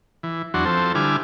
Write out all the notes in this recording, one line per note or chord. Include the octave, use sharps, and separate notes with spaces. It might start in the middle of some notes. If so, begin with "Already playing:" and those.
E3
E2 F#3 D4 F#4 C6
F3 C4 A4 C5
D3 G3 E4 G#5 D6 F6